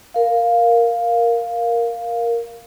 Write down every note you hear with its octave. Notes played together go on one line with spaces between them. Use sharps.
A#4 F5